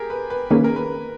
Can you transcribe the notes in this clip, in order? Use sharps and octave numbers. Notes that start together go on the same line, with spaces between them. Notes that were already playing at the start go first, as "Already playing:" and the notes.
Already playing: G4 G#4 A#4
B4
B4
D#3 A#3 C#4 G#4 B4
A#4
B4